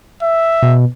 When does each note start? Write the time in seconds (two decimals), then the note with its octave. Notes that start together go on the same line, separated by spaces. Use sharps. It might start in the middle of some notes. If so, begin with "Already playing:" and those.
0.23 E5
0.63 B2